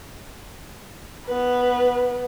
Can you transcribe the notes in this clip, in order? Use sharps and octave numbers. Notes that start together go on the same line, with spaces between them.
B3 B4